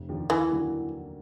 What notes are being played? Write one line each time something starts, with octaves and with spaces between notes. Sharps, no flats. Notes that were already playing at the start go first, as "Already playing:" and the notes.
Already playing: F1
D#2 D3 F3
D#2 E3
D3 F#3 A#3